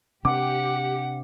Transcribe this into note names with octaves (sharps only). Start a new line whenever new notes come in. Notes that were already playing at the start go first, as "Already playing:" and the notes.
C3 C4 D4 G4 F#5 D6